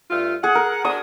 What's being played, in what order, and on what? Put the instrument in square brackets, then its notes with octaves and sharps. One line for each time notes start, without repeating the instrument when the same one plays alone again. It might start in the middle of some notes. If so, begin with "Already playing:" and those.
[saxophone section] G2 A3 F4
[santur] G#4 [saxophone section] F#5
[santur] A#4
[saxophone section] D4 F#4 [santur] D#6